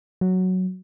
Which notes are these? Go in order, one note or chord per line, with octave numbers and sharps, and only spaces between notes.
F#3